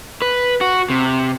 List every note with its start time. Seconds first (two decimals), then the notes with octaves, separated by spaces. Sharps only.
0.22 B4
0.61 F#4
0.90 C3